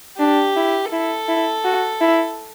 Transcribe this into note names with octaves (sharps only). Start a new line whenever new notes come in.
D4 G4
E4
E4 A4
E4
F#4
E4